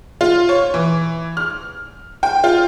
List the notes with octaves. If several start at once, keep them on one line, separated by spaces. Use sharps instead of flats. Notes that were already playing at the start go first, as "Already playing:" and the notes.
F4
C#5
E3
F6
G5
F4